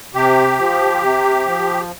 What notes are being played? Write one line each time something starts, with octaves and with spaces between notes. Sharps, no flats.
C3 G4
F3
C3
F3